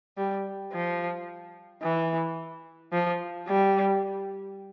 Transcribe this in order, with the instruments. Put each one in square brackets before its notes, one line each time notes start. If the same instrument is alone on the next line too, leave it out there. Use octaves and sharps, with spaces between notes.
[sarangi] G3
F3
E3
F3
G3